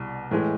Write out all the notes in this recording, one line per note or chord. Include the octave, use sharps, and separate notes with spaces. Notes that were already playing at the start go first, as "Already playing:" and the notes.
Already playing: C2 B2 G3
A2 E3 G#3